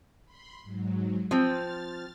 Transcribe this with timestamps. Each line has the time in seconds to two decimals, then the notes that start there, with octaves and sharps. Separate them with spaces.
0.25 B5 C6
0.63 G#2 F#3
1.31 F3 C4 F6 A6